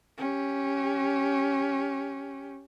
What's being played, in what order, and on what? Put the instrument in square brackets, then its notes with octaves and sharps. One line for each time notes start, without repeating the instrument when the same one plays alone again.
[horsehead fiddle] C#4 G4